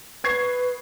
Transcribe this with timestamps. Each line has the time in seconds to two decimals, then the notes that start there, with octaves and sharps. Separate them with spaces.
0.24 B4 C#6 G#6 C7